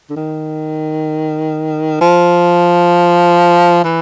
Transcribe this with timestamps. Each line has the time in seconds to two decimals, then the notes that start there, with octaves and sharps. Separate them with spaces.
0.10 D3
0.16 D#3
2.01 F3
3.84 E3